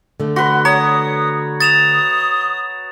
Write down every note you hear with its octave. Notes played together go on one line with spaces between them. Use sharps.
D3 A3
F#4 B4 C6
C#5 A#5 D#6
D#6 A6 E7 F7